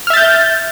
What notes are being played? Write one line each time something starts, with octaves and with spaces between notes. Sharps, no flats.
E5 F6 G6 A6